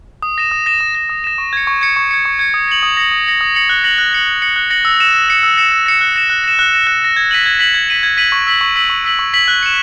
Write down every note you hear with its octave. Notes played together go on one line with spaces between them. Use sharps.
D#6
A#6 E7
D#6
A#6 E7
D#6
A#6 E7
D#6
A#6 E7
C#6
G#6 C#7
C#6
G#6 C#7
C#6
G#6 C#7
C#6
G#6 C#7
D#6
A#6 C#7 F#7
D#6
A#6 C#7 F#7
D#6
A#6 C#7 F#7
D#6
A#6 C#7 F#7
F#6
A#6 C#7 F#7
F#6
A#6 C#7 F#7
F#6
A#6 C#7 F#7
F#6
A#6 C#7 F#7
E6
A#6 C#7 E7
E6
A#6 C#7 E7
E6
A#6 C#7 E7
E6
A#6 C#7 E7
F#6
A#6 E7
F#6
A#6 E7
F#6
A#6 E7
F#6
A#6 E7
G#6
B6 D#7 F#7
G#6
B6 D#7 F#7
G#6
B6 D#7 F#7
G#6
B6 D#7 F#7
C#6
E6 B6 F#7
C#6
E6 B6 F#7
C#6
E6 B6 F#7
C#6
E6 B6 F#7
F#6
C#7 E7